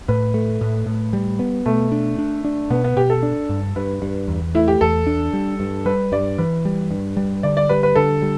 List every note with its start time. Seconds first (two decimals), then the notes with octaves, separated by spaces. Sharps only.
0.08 A2 B4
0.34 A3
0.61 A2
0.86 A2
1.13 G3
1.39 B3
1.66 B2 A3
1.92 D4
2.18 D4
2.45 D4
2.70 B2 B3
2.84 B3
2.96 B2 G4
3.10 A4
3.23 D4
3.49 G2
3.76 G2 B4
4.02 G2
4.28 E2
4.55 A3 E4
4.68 G4
4.81 E2 A4
5.07 D4
5.33 G3
5.60 G2
5.86 G3 B4
6.12 G2 D5
6.38 E3 B4
6.65 G3
6.91 G2
7.17 G3
7.43 D3 D5
7.57 D5
7.69 G3 B4
7.83 B4
7.95 D3 A4
8.22 G3